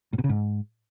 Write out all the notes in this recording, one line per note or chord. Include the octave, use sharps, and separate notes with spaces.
A2
B2
C#3
G#2